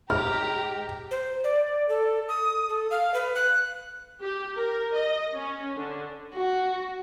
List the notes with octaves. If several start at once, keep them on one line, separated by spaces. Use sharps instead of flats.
G#2 G4 A#5 F6
C5
D5
A4
D#6
A4
F5
B4
F#6
G4
A#4
D#5
C#4
D3
F#4